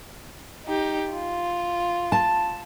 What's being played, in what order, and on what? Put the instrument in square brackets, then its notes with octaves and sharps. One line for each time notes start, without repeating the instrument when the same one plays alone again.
[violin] D#4 G4
F4
[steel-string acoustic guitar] A5